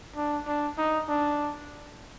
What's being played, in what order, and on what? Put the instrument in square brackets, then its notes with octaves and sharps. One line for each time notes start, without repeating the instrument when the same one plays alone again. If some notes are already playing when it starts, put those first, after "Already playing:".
[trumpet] D4
D4
D#4
D4